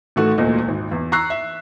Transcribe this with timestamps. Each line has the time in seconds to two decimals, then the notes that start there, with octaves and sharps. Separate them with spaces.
0.16 A1 D#3 A3 F#4
0.38 E1 D2 A#2 D#5
0.68 G#1
0.92 E2
1.12 A#5 C#6 E6 F#6 C7
1.30 E5